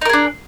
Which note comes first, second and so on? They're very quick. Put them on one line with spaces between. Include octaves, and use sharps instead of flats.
D#4 A#4 G#4 D4